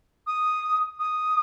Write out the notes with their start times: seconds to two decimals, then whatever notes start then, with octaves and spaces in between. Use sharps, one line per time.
0.27 D#6
1.00 D#6